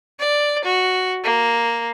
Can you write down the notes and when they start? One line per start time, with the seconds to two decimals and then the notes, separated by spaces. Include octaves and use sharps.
0.20 D5
0.64 F#4
1.24 A#3